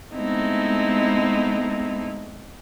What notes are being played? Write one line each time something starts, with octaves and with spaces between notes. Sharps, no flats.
G#3 A3 B3 C4 D#4 E4